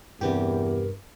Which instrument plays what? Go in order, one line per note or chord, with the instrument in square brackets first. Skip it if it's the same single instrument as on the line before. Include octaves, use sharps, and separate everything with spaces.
[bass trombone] E2 [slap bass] G2 [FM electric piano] C3 B3 G4 [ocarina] A#4